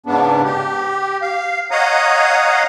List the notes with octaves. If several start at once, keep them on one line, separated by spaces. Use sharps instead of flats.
G#2 C#3 B3 D4
G4
F5
C#5 D#5 F5 F#5 A#5 D#6